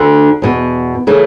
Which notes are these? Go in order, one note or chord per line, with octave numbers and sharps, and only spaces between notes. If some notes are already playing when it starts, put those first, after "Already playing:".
Already playing: D2 D3
E2 B2
C#3 E3 A3